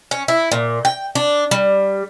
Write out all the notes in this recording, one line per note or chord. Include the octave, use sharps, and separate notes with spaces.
C#4
E4
A#2
G5
D4
G3